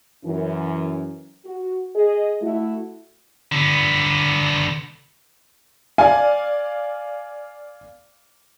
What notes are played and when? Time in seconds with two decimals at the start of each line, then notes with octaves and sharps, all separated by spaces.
0.25 F#2 E3 C#4
1.45 F#4
1.95 G#4 D#5
2.42 A3 E4 F#4
3.52 D3 B3
5.98 D5 F5 G#5